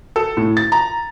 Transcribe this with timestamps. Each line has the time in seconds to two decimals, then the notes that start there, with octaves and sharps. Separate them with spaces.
0.16 A4
0.37 A2
0.57 A6
0.72 A#5